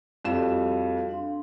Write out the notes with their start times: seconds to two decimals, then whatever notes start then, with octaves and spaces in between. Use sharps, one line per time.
0.25 F2 G3 F#4 A4 F5 E7
1.09 D4 F5 C6